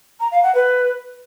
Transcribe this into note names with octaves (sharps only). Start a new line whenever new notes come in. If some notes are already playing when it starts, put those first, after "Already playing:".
A#5
F5
F#5
B4